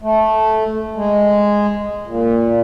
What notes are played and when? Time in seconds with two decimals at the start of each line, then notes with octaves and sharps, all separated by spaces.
0.02 A3
0.96 G#3
2.07 A#2